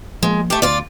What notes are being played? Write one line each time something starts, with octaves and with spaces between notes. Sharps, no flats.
F3 G#3 A#3
A3 G4
D2 F4 D5